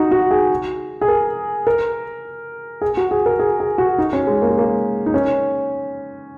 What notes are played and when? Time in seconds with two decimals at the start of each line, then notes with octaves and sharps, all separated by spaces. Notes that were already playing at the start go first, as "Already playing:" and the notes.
Already playing: D#4 F#4
0.11 F#4
0.31 G#4
1.01 G#4
1.08 A#4
1.67 A#4
2.81 G#4
2.97 F#4
3.11 G#4
3.26 A#4
3.39 G#4
3.60 G#4
3.78 F#4
3.98 D#4
4.13 C#4
4.27 G#3
4.42 A#3
4.50 G#3
4.58 A#3
5.06 D#4
5.14 C#4